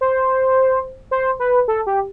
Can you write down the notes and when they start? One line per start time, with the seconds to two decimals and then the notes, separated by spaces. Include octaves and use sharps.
0.01 C5
1.11 C5
1.40 B4
1.68 A4
1.87 G4